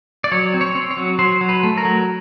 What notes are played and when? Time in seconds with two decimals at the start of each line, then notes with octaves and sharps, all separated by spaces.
0.24 D5
0.32 F#3 C#5
0.54 C4
0.61 C#5
0.75 C4
0.91 C#5
0.97 F#3
1.19 F#3 C5
1.41 F#3
1.49 B4
1.63 A3
1.77 A#4
1.85 F#3